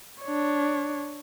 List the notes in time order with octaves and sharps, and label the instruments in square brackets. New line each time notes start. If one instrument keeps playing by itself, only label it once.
[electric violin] D4 C#5